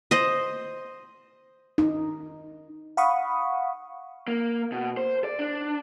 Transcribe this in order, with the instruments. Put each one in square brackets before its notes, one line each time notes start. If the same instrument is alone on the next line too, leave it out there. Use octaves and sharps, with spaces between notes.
[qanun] C5 D#5
[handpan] D#4
[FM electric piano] F5 F#5 B5 C#6 D#6
[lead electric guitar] A#3
B2
C5
D5
D4